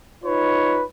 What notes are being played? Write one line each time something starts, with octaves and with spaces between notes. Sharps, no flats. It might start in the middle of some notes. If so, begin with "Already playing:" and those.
D#4 F4 B4 C#5